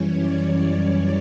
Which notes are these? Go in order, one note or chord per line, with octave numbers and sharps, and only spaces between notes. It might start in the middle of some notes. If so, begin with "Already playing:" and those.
Already playing: F#2 E3 G3 C#4 C#5
D5
C#5